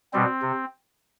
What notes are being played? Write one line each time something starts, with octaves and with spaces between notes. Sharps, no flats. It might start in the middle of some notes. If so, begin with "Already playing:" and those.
B2 G3 C4
C3